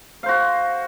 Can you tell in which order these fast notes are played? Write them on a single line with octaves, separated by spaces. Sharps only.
F5 C5 F#4